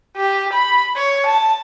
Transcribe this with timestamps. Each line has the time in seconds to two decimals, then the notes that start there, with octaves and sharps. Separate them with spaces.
0.16 G4
0.53 B5
0.96 C#5
1.26 A5